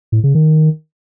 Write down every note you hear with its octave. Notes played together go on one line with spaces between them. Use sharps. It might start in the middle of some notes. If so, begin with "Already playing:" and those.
A2
C#3
D#3